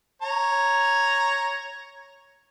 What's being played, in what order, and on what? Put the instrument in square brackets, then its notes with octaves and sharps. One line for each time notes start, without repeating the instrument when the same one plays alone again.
[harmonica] C#5 A#5